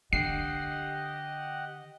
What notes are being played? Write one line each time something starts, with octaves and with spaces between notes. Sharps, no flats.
D3 G4 D#5 F#5 C7